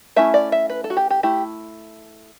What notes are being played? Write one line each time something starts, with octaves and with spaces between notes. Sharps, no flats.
A3 C#4 E4 E5
D5
E5
B4
A4
F#4
G4
G4
A3 E4 G4